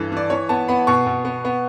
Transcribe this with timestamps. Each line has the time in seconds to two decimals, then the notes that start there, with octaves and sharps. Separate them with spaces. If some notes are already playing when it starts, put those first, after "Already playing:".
Already playing: G2 E3 A4
0.12 E3 D5
0.30 E3 C#5
0.49 B3 A5
0.68 B3 B5
0.87 B2 C#6
1.06 B2
1.25 B3
1.45 B3